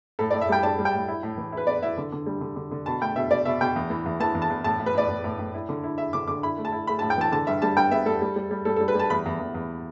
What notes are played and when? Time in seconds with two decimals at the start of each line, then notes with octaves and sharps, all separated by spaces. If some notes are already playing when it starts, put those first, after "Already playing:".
0.19 A2 A4
0.31 A2 D5
0.41 E5
0.49 G3 G5
0.63 D4 A5
0.79 G3
0.85 G5
0.93 A2
1.08 E4
1.23 A2
1.38 E3
1.52 E4 B4
1.67 B3 D5
1.83 E4 E5
1.97 D3
2.12 D3
2.26 G3
2.41 D3
2.56 D3
2.71 D3
2.86 B2 A5
3.01 A3 G5
3.16 B2 E5
3.31 B2 D5
3.45 B2 E5
3.61 B2 G5
3.76 E2
3.90 E3
4.06 E2
4.20 E3 A5
4.35 E2
4.42 A5
4.50 E2
4.64 A2 A5
4.80 A2
4.86 B4
4.94 A2 D5
5.09 A2
5.24 A2
5.39 A2
5.54 E4
5.69 D3
5.84 E4
5.98 E4 E5
6.13 D3 D6
6.27 D3 D6
6.43 E4 B5
6.58 A3
6.65 A5
6.72 E4
6.87 A3 B5
6.99 A2 A5
7.10 G5
7.18 E3 A5
7.32 D3 A5
7.47 G2 E5
7.62 G3 A5
7.77 G2 G5
7.91 B3 E5
8.06 G3 A4
8.22 G3
8.36 G3
8.51 G3
8.65 G3 A4
8.76 G3 A4
8.88 B4
8.95 G3 A5
9.10 E2 B5
9.26 E2
9.40 E2
9.54 E2